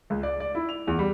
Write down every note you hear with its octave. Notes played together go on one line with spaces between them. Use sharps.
C#2
D5
D5
E4
F7
E2
G3